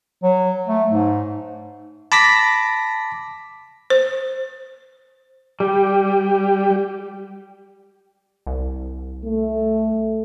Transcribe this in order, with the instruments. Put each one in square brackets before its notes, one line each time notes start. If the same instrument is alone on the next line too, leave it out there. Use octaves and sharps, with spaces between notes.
[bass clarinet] F#3
A3
G#2
[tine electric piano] A5 B5 D6 A#6 B6
[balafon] C5
[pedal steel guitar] G3 [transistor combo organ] G4
[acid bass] C2
[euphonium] A3